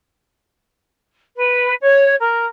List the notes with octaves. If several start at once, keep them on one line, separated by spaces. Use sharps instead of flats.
B4
C#5
A#4